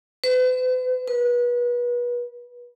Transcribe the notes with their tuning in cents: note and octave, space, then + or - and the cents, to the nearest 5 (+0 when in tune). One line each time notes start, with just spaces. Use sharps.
B4 +45
B4 -30